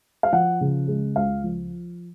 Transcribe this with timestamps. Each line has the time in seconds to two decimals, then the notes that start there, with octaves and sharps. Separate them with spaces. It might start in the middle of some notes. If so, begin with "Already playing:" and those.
0.23 F5
0.33 F3 F#5
0.61 C#3
0.88 G#3
1.16 C#2 F5
1.44 F3